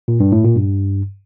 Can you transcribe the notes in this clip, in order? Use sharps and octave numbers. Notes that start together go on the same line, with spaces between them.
A#2
G2
A2
A#2
G2